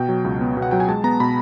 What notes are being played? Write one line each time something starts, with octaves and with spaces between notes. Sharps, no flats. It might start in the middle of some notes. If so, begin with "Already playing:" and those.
Already playing: B2 G5
F#3
C#2
B3
B2
F#5
F#3 G5
G#5
G#3 A5
B3 A#5
B2 B5